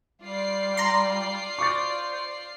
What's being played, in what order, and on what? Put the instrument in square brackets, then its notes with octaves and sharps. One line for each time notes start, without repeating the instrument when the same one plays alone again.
[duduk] G3 [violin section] F4 D5 C7
[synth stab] A#5 C6
[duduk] C5 [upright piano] C#6 D6 A6